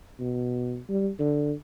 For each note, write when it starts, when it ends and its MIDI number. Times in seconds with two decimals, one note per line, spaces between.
0.20 0.79 47
0.89 1.10 55
1.19 1.53 50